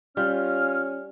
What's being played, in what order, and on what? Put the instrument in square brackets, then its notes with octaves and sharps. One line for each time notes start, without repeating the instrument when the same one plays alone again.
[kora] G3 [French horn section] C#4 [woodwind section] F4 F6